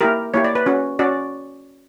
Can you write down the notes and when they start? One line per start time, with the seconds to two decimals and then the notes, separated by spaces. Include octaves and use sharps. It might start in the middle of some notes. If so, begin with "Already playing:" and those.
0.01 A#3 E4 G4 A#4
0.34 A#3 E4 G4 C#5
0.44 D5
0.55 B4
0.66 C#4 F#4
0.99 C#4 F#4 D5